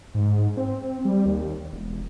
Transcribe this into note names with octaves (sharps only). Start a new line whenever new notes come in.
G#2
C4
G3
D#2
E1